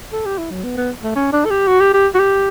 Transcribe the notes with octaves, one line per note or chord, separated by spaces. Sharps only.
A4
G4
E4
F#3
B3
B3
A3
C#4
D4
A4
G4
F#4
G4
G4
F#4
G4